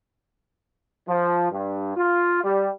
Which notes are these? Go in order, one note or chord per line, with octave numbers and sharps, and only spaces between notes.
F3
G2
F4
G3